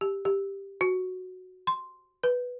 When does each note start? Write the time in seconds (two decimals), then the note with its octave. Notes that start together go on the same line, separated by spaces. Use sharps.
0.01 G4
0.25 G4
0.81 F#4
1.67 C6
2.23 B4